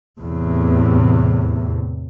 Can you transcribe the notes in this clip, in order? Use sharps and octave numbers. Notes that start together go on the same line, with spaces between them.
E2 A2 C3